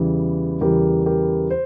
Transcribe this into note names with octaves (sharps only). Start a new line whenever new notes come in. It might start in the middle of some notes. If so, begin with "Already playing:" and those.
Already playing: E2 C#3 E3 G3
E2 C#3 E3 G3 G4 A#4
G4 A#4
C5